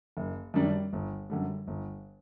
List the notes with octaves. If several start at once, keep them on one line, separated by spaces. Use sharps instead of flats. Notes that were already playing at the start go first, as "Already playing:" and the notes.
F#1
F#2 D#3 G3 D4
G1
F#2 D3 G3
G1